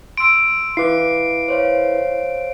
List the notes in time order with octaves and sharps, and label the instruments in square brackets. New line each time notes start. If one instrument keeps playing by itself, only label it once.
[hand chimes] C6 E6 [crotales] D7
[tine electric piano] E4 B4 [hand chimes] F5 D6 [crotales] C7
[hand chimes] C5 C#5 F5